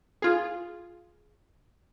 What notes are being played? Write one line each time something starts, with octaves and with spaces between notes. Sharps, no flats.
F4 G#4